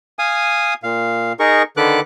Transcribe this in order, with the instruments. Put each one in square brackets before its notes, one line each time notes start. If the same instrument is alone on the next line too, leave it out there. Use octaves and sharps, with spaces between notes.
[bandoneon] F5 G#5 D#6
A#2 F5
D#4 G#4 A#4 C#6
D3 D#3 A4 B4 D6 F#6